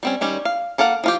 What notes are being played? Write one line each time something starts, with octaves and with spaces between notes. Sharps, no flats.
G3 C4 C#4
D#3 G3 C#4
F5
A#3 A4 A#4 F5 F#5
F3 F4 G4